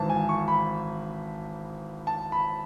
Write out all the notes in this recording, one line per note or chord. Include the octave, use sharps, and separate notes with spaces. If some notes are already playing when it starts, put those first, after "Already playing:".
Already playing: G#1 G#2 E3 A5
G#5
C#6
B5
A5
B5